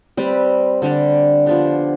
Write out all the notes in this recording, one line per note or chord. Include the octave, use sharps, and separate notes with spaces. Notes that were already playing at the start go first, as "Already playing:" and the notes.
G3 C4 G4 B4
D3 G3 D4 G4
F3 B3 D4 G4